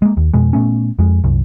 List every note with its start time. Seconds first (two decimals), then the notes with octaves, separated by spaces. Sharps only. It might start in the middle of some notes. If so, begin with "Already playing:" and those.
0.02 G#3 A#3
0.17 D#2
0.34 F2 B2 G#3
0.53 A#2 A3 B3 C#4
0.99 F2 G#3
1.24 C2 F#2